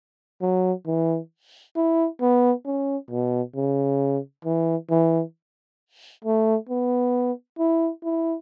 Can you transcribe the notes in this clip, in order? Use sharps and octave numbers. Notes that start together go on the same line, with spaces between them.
F#3
E3
E4
B3
C#4
B2
C#3
E3
E3
A3
B3
E4
E4